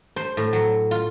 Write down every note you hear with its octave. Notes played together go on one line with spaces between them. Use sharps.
C5
A2
F#3
F4